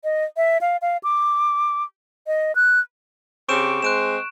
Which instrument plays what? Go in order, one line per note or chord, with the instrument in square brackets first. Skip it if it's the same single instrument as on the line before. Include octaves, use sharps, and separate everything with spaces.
[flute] D#5
E5
F5
F5
D6
D#5
F#6
[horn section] C#3 C4 G4 [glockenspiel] C#6 D7 E7
[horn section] G#3 C4 C5 [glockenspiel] F#6 D7 E7